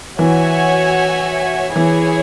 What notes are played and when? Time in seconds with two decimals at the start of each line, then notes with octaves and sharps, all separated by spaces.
0.18 E3 F#4 C#5 E5 G#5
1.74 E3 E4 G#4 C#5 G#5